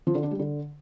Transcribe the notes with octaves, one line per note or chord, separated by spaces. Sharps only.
F3
D3
D4
G3
D3